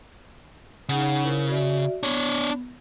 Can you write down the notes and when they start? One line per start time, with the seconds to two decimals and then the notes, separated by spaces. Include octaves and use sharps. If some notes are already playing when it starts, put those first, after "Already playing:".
0.89 C#3 D#4 G#4 F#5
1.23 E4 A#4 C5
1.48 F#4 D5 E5
2.03 B3 D4 C#5